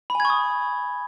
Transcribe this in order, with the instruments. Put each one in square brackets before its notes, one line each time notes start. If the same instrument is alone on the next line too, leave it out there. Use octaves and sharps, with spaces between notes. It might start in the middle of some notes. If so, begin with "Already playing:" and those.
[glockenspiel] B5
G#5
G#6
C#6
D#6